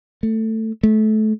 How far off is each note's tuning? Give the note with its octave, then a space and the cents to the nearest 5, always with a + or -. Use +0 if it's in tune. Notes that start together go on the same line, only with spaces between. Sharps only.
A3 +15
A3 -25